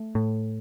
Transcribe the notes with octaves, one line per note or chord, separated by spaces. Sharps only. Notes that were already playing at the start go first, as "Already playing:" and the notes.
Already playing: A3
A2